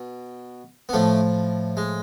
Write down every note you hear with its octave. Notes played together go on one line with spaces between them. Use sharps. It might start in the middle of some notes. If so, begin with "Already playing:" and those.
Already playing: B2
B3
A2 F3 A3
G#3